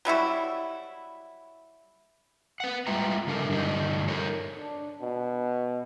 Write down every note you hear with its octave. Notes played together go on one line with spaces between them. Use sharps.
F#3 G3 E4 F#4
B4 F#5
G3 G#3 F4 E5 G5 A#5
C#3 G#3 D4 A4 A#4
G2 D3 G3 D4 D#4
A4 A#4 C#5
D4
B2